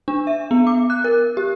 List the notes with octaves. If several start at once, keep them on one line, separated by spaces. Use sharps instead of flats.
D4
E5
B3
D6
F#6
A#4
G4